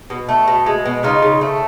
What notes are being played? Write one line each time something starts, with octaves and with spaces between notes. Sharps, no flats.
B2
A3
B2
G#3
B2
C#3 D#4 F4
C#3
A3